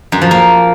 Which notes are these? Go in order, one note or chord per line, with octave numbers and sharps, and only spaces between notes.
F#2
F3
A#3